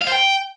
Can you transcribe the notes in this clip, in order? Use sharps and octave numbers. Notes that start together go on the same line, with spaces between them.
F5
C5
G5